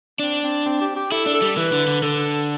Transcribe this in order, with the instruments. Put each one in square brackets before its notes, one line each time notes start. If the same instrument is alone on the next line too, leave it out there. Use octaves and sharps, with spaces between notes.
[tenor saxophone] C4 [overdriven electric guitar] D4
[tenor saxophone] C4
C4
G4
G4
[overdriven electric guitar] E4 [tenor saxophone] A4
[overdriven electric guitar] D4
[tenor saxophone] A4
[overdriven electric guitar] G3
[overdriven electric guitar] E3 [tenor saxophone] B4
[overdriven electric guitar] D3
D3
[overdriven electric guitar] D3 [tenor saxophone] A4